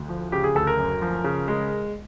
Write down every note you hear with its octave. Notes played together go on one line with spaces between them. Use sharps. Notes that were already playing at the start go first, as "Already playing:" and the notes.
Already playing: D2
F3
C#3 G4
G#4
D2 A4
A#4
F#2
F3
C#3
G#3